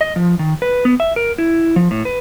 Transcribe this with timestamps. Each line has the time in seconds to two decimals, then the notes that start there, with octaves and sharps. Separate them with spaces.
0.01 D#5
0.16 F3
0.39 D#3
0.62 B4
0.85 B3
1.00 E5
1.16 A#4
1.38 E4
1.76 F3
1.91 A2
2.05 B4